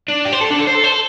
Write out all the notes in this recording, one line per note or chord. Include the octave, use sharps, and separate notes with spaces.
D4
G4
C5
A4
D4
A4
C5
A4
C5
A4